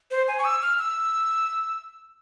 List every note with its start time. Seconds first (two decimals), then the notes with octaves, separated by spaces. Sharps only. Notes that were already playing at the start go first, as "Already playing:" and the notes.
0.11 C5
0.28 G#5
0.38 C#6
0.45 E6
0.62 F6
0.79 E6